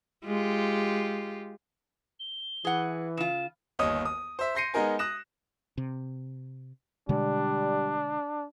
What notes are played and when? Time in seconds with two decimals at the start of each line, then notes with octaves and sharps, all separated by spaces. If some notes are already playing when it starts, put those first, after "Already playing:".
0.25 G#3 F4 G4
2.19 G7
2.65 E3 G#4 F#5
3.17 C#3 F4 E7
3.79 G1 D#2 C#5 D#5 D#6
4.05 D#6
4.39 C5 E5
4.55 C6 G6 A#6 C7 C#7 D#7
4.74 G#3 B3 D#4 A#4 G#5
4.99 D#6 F#6 A#6 E7
5.78 C3
7.09 B2 D3 G3 G#3 D4